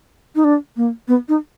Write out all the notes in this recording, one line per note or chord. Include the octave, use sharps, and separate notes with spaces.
D#4
D4
A#3
B3
D#4